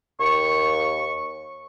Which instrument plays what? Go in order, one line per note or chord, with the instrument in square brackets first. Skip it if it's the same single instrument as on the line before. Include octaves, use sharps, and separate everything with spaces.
[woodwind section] D#2 C#6